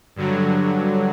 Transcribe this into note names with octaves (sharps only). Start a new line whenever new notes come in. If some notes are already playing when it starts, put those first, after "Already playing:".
G2 D3 F#3